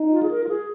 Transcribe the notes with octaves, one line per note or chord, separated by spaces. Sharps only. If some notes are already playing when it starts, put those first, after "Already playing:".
Already playing: D#4
F4
G#4
A#4
F4
G#4